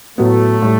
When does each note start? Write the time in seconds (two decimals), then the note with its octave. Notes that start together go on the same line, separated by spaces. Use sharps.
0.18 A2 F#3 A3 B3
0.62 A2 G3